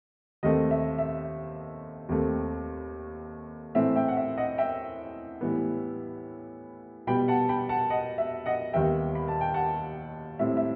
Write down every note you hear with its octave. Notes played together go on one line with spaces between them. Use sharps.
D#2 D#3 A3 C4 D#5
E5
E5
D#2 D#3 A3 C4
A2 E3 A3 C4 E5
E5 G5
F#5
E5
D#5 F#5
E5 G5
A2 E3 G3 B3
B2 G3 B3 G5 B5
F#5 A5
G5 B5
F#5 A5
D#5 F#5
E5
D#5 F#5
D#2 D#3 G3 B3 E5 G5
B5
A5
G5
F#5 A5
A2 G3 C4 E5
E5